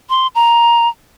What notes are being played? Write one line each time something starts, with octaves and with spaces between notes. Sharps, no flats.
C6
A#5